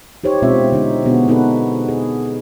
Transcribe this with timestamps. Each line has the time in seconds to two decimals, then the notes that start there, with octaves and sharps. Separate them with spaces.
0.24 D#4 G4 C5 C#5
0.42 B2 G#3 C4 C#4 F4 E5
0.72 D3 D#4
1.05 B2 B3 D4 F#4 G#4
1.28 C4 D#4 F#4 A4 B4
1.88 G#4